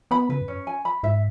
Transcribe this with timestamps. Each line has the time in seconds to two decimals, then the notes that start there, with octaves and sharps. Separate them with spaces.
0.11 B3 B5
0.29 C#3 B4
0.41 F#2
0.48 C#4
0.67 G#5
0.85 B5
1.03 G#2 E5